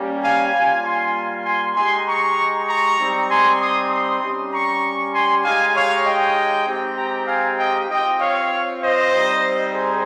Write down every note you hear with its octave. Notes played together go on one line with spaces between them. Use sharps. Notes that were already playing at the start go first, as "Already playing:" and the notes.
Already playing: G3 A#3 C#4 G4
F5 G#5
G3 A#3 F4 F5 G#5
G#5 C6
G#5 C6
G#3 D#4 G4 G#5 C6
A#5 C#6
A#5 C#6
G3 C4 D#4 G4
G#5 C6
C6 D#6
C6 D#6
G3 C#4 G4
A#5 C#6
G#5 C6
G#3 D#4 G4 F5 G#5
C#5 F5
D#5 G5
G#3 C4 D#4 G4
G5 A#5
F5 G#5
D#5 G5
C4 F4 D#5 G5
C#5 F5
C5 D#5
G3 C4 D#4
G#4 C5